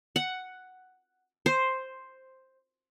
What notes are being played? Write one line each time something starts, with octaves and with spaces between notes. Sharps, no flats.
F#5
C5